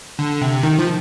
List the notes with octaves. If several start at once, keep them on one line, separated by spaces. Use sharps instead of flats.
D3
C3
D#3
F3